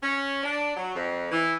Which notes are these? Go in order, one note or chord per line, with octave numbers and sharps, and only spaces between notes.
C#4
D4
F#3
F2
E3